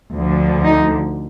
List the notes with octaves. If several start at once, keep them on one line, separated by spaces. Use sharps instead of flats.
D2 D3 F3
D#4